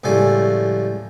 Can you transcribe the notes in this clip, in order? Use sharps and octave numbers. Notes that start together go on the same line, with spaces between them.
C#2 A2 F3 G3 G#5